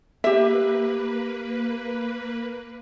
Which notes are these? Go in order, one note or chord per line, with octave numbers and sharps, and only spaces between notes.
A#3 G4 B4 E5